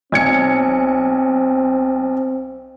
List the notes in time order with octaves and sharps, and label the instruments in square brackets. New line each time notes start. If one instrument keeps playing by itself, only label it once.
[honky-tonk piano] B1 G#6 C#7 [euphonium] C4